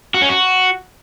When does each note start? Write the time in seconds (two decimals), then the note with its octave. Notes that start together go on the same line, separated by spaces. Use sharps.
0.14 F#4
0.22 C#4
0.29 F#4